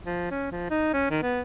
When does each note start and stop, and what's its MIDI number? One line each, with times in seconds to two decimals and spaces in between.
0.05 0.29 53
0.31 0.48 61
0.52 0.66 53
0.70 0.94 63
0.94 1.06 61
1.10 1.19 51
1.22 1.42 59